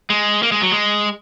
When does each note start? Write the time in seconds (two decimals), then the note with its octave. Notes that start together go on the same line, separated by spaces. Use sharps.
0.10 G#3
0.43 A#3
0.52 G#3
0.62 F#3
0.72 G#3